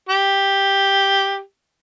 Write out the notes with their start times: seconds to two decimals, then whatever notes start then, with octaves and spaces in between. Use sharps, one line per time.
0.09 G4